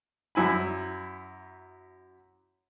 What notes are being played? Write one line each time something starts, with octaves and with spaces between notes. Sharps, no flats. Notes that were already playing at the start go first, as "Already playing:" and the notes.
F#2 E4 G#5 B5